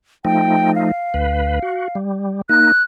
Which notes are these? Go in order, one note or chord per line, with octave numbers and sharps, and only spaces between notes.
F3 A3 D#4 G5
F5
D2 B4
F#4
G3
A#3 D#4 F#6